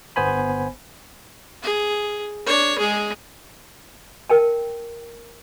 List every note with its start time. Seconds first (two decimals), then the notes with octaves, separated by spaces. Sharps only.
0.16 G1 B3 C5 G#5 B5
1.63 G#4
2.46 D4 C#5
2.79 G#3 G#4
4.30 A#4 G5 A5